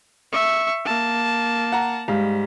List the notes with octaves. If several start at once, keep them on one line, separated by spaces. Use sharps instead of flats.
E5 C#6
A#3 A5
F#5 A#5
G#2 G3 F5